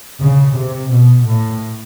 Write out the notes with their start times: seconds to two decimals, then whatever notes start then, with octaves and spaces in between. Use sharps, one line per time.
0.20 C#3
0.56 C3
0.90 B2
1.25 A2